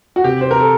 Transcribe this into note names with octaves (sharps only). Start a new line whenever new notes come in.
F#4
C3 G4
C5
C4 A#4
A4